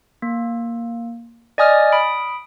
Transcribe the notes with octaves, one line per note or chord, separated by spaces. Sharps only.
A#3
D5 D#5 G#5 D#6 F6
B5 D#6 D7